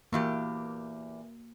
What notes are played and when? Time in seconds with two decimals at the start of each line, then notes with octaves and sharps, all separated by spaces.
0.13 E2 E3 A#3 F#4 G4 F5